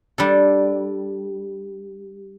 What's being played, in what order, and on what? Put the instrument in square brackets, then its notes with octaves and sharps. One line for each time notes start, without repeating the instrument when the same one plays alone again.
[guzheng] G3 D4 A4